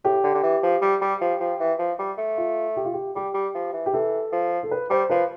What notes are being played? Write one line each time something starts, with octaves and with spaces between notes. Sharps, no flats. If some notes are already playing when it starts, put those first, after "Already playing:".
A2 G4
D3
D3
E3
F3
G3
G3
F3
F3
E3
F3
G3
A3
F4
G4
F4
G4
G3 G4
G3
F3
E3
G4
E3 A4
F3
A4
B4
G3 C5
F3 B4